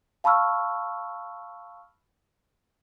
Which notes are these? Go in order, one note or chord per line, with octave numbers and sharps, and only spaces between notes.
F5 A5 B5 C#6 E6 F6